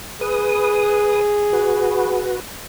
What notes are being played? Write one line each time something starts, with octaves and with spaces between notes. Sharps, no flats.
G#4 B4 D#6
F#4 B4